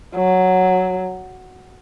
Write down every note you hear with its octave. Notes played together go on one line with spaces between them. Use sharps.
F#3